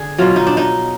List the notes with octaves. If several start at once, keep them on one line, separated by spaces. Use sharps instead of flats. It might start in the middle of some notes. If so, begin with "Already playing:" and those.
Already playing: D3 G#4
B2 F#3 F4
D#4
D4
D#4